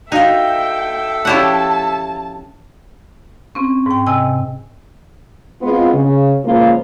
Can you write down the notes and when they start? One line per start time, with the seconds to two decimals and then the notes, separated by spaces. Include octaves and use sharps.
0.12 D#4 F#4 A4 A#4 E5 F5 G5
1.25 F3 C#4 E4 G4 C#5 F#5 A5
3.55 C4 C#4
3.86 G#2 G5
4.07 C3 D#5 G5 G#5 E6
5.61 G#3 B3 C4 F4
5.93 C#3
6.44 C#3 F3 G#3 A#3 F4 B4